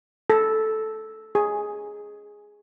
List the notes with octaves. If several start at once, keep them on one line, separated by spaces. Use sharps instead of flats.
A4
G#4